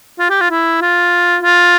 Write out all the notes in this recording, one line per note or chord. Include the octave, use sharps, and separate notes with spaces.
F4
G4
F4
E4
F4
F4